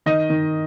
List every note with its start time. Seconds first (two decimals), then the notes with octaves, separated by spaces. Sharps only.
0.06 D#3 D#5
0.30 D#3